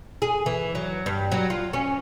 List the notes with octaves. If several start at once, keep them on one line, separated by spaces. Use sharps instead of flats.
G#4
E3
F#3
G2
F#3
F4
C#4